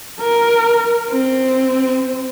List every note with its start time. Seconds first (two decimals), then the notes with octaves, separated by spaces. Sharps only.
0.20 A#4
1.10 C4